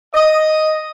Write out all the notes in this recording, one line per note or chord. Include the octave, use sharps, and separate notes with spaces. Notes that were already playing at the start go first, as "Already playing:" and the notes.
D#5